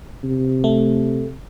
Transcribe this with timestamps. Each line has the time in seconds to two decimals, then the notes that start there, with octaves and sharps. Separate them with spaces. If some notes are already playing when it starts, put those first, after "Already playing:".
0.24 C3
0.64 A3